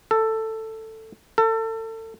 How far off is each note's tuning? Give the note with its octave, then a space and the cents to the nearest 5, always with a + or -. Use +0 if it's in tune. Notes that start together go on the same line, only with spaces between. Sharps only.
A4 +10
A4 +30